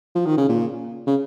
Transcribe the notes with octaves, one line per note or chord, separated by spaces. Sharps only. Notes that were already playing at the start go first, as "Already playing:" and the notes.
F3
D#3
C#3
A#2
C#3